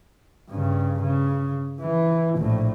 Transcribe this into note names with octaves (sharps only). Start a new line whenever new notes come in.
G2 C#3
C#3
E3
A#1 A2